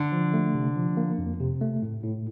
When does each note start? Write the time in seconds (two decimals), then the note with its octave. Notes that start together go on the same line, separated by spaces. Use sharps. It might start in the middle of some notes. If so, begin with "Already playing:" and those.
Already playing: D3
0.12 F3
0.34 A3
0.54 C3
0.75 F3
0.97 A#3
1.18 F2
1.40 C3
1.61 A3
1.82 A2
2.04 A2